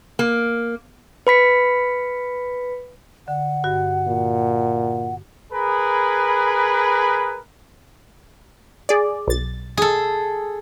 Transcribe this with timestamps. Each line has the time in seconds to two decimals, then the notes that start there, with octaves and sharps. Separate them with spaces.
0.19 A#3
1.27 B4 B5 B6 C#7
3.28 D3 F#5
3.64 G2 F#4
4.07 A#2
5.52 G#4 A#4 B4 B5
8.89 G#4 D5
9.28 B1 A6
9.77 G#4 A4